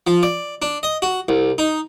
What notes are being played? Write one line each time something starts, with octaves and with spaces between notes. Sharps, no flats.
F3
D5
D4
D#5
F#4
C2
D#4